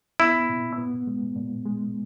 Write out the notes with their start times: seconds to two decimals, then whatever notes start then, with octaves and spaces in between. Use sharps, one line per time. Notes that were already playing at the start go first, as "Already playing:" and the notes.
0.20 B3 E4
0.49 A#2
0.77 B3
1.07 G#3
1.36 A#2
1.65 G#3